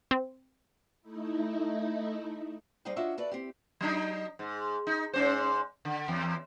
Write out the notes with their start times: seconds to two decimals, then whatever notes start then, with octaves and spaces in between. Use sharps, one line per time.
0.11 C4
1.02 A3 D#4 E4
2.85 G3 D#4 G#4 C5 F5 G5
2.96 D4 F4 F#4 C#5 D#5 E5
3.18 F#4 A4 B4 D5 E5
3.32 C4 E4 G4
3.81 F#3 D4 D#4
4.39 G#2
4.87 D#4
5.13 G#2 C#4 C5
5.85 D3
6.08 E2